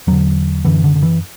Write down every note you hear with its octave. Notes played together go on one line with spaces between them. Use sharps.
E2 D3 F#3
F#2 D3 E3
D3
D3
E3